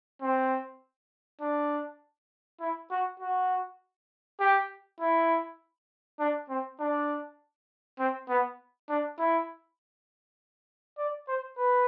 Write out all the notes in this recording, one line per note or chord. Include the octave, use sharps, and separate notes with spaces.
C4
D4
E4
F#4
F#4
G4
E4
D4
C4
D4
C4
B3
D4
E4
D5
C5
B4